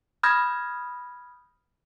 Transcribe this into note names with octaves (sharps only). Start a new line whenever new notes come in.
B5 D#6 F6 G6 G#6 A#6